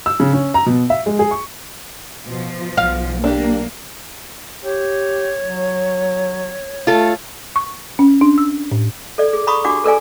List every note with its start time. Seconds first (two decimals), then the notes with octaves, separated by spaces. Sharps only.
0.06 E6
0.20 C#3
0.33 C#4
0.54 A#5
0.66 B2
0.90 E5
1.06 G#3
1.19 G#4
1.31 C#6
2.26 B2 F3
2.77 B1 F5
3.24 A#3 D4 G4
4.64 G4 C#5
5.42 F#3
6.87 A3 F4 A4
7.56 C#6
7.99 C#4
8.21 D4
8.38 E6
8.72 A2
9.18 A4 D5
9.33 G#4
9.47 A#5 B5 C#6 D#6
9.64 D4 F#4 G4 F#5 D6
9.84 A4 A#4 D5 G#5